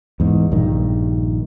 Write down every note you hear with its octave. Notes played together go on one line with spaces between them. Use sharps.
E2 G#2
A#1 G2 D#3